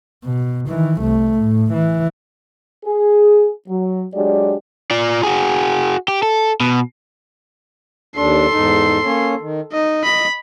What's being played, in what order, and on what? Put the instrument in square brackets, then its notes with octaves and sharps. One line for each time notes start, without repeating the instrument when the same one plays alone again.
[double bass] B2
D#3 E3
C2 A3
A2
E3
[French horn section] G#4
F#3
F#3 G#3 D4 G4 D5
[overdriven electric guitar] F4 D5
F#4 G#4
G4
A4
B2
[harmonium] D#2 D4 [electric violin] A4 C6
[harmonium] E2 G#2 D#4
A#3 C#4 C#5
D#3
[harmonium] D#4 [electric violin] D#5
[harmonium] D#5 [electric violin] B5